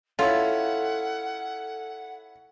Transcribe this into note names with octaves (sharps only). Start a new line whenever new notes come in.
C#4 E4 F4 A4 F#5